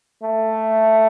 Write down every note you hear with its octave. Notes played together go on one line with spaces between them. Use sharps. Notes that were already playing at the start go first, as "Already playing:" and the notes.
A3